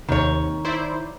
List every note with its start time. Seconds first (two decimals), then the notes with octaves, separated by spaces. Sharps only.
0.09 D#2 C3 D#3 C#5
0.65 E4 C5 D5